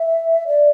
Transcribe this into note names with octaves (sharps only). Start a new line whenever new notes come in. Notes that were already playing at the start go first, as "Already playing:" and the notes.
Already playing: E5
D5